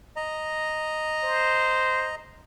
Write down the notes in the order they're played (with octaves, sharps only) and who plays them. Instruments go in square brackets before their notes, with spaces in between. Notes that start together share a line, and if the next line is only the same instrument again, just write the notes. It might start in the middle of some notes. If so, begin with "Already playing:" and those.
[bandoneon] D#5 A#5
[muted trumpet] C5